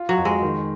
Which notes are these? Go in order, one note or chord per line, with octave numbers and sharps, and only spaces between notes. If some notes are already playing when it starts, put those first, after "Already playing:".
Already playing: F4
F#3
F2
G#3
D#3